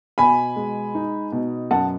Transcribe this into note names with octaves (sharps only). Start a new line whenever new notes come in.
B2 G#5 B5
G#3
D#4
B2
F#2 F#5 A5